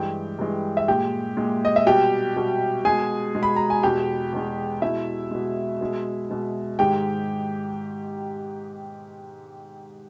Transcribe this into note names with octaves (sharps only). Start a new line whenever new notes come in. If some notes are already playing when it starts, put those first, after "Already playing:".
Already playing: G2 E3 G#3 G4 G5
G2 E3 G#3
E5
A#2 G#3 G4 G5
A#2 G#3
D#5
E5
B2 G3 G4 G5
B2 G3
B2 G#3 G#4 G#5
B2 G#3
B5
A#5
G#5
E2 B2 G#3 G4 G5
E2 B2 G#3
B2 G#3 E4 E5
B2 G#3
B2 G#3
B2 G#3
G#2 D#3 G#3 G4 G5